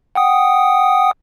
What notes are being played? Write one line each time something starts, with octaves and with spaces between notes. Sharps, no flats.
F#5 G5 D#6